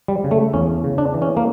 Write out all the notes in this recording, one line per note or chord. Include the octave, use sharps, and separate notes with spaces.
G3
C#3
A3
E2 C#4
C#3
D4
E3
C#4
A#3